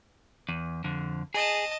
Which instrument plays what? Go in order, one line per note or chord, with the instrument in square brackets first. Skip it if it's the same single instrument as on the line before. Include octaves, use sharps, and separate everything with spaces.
[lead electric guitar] E2
F2 D3
[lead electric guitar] G#4 [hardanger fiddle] D#5 A5